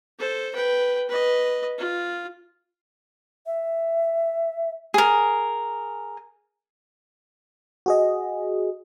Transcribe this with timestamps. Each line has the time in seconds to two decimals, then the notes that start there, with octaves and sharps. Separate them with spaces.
0.19 A4 C5
0.55 B4 G5
1.09 B4 D#5
1.78 F4
3.46 E5
4.94 G#4 A#4
7.86 F#4 G#4 D#5